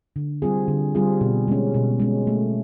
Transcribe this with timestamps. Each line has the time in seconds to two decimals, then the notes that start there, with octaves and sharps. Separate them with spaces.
0.16 D3
0.42 G3 C4 F4 G#4
0.68 D3
0.95 G3 C4 F4 G#4
1.21 B2
1.48 G#3 C#4
1.74 B2
2.00 G#3 C#4
2.27 A3